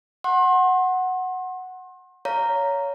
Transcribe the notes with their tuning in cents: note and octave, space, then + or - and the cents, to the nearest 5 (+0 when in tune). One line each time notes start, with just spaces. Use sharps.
F#5 +0 C6 +35
C#5 +20 F5 +0 A#5 -10